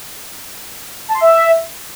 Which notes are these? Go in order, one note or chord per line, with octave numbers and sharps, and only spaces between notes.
A5
C6
E5